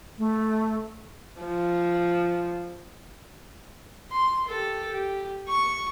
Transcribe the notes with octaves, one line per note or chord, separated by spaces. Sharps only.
A3
F3
C6
G4 A4
G4
C#6